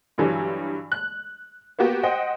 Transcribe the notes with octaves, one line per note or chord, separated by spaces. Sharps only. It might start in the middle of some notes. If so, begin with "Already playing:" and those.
G2 D3 E3 F#3 G3
F#6
A#3 B3 F#4 G4
C5 D#5 F#5 G5